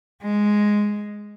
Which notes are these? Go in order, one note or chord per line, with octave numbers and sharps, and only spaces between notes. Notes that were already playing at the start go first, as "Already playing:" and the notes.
G#3